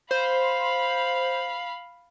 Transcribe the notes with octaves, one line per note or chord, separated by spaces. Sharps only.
C5 F5 B5